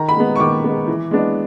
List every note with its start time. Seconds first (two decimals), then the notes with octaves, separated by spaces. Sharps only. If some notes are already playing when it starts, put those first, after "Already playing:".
Already playing: D#3 A#5
0.09 B5
0.17 G#3 B3
0.36 C#6
0.40 D#3 D6
0.64 G#3 B3
0.88 E3
1.11 G#3 B3 D4